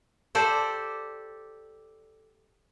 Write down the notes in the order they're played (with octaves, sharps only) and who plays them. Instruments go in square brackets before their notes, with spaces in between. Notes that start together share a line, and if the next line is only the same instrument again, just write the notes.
[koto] G4 A4 C5 D5